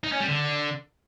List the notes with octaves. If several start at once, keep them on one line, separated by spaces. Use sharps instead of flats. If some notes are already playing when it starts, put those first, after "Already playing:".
D#4
C#4
G3
D3